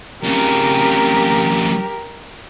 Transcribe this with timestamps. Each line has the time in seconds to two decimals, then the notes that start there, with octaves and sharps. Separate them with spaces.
0.24 F2 C#3 G4 A#4